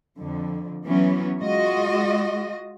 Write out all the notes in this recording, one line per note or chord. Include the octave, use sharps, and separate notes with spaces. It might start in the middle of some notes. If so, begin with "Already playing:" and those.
F2 D3
E3 F#3 B3 C#4
G#3 F4 F#4 D#5